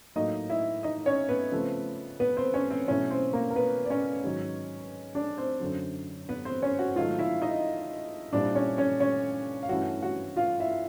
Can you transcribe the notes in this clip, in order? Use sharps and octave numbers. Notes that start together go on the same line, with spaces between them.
A2 F#3 A#3 D#4 D#5
E4 E5
D#4 D#5
C#4 C#5
B3 B4
C#3 F3 A3 C4
B3 B4
C4 C5
C#4 C#5
C4 C5
B2 F#3 A3 C#4 E4 C#5
C4 C5
A#3 A#4
A#4
B3 B4
D5
C#4 C#5
G#2 D#3 F#3
D4 D5
C4 C5
F#2 D3 F#3
B3 B4
C4 C5
C#4 C#5
F#4 F#5
G#2 D#3 F#3 A3 F4 F5
E4 E5
D#4 D#5
A#2 G3 C4 D4 E4 D5
C#4 C#5
C#4 C#5
C#4 C#5
F5
G2 E3 A3 C#4 E4 F#4 F#5
F#4 F#5
F4 F5
E4 E5